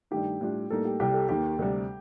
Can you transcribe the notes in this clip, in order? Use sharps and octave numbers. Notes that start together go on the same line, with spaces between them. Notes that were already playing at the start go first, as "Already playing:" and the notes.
G2 D#3 A3 D#4 G4
A2 G3 D4 F4
A2 G3 A#3 D#4 A4
G4
C2 C3 G3 G4
A4
D#2 D#3 A#3 G4
D2 C3 G3